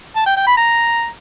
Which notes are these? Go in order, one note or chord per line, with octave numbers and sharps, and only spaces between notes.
A5
G5
G5
B5
A#5